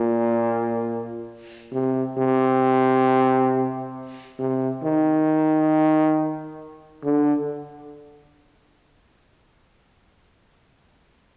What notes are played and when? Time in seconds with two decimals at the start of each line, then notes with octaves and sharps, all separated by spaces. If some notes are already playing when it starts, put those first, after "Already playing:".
Already playing: A#2
1.73 C3
2.18 C3
4.39 C3
4.83 D#3
7.04 D3